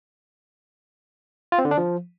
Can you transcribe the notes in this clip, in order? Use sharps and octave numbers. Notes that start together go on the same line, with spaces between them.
F4
C4
D3
D4
F3